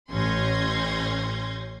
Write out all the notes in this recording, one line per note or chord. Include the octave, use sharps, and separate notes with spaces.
A1 C#4 C6 G6 G#6 A#6